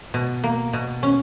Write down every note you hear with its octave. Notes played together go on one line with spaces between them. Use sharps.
B2
A#3
B2
C#4